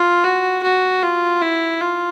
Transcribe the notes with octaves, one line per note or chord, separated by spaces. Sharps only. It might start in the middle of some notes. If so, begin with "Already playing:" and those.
Already playing: F4
F#4
F#4
F4
E4
F4